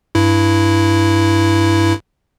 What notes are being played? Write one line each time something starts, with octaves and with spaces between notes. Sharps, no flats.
G2 E4